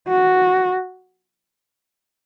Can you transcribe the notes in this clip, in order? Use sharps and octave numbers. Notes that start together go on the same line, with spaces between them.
F#4